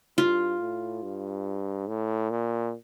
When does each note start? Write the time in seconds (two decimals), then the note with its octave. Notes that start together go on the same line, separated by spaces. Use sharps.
0.18 G2 F4
0.60 A2
1.03 G2
1.88 A2
2.31 A#2